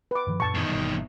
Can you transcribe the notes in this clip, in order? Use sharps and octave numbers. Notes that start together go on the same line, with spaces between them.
B4 D6
G2 D#3 F3
F#2 A#2 A5 C#6
E2 D#3
G1 B2 G3